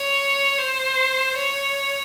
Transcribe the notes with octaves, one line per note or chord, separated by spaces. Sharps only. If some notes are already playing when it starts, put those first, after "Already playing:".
Already playing: C#5
C5
C#5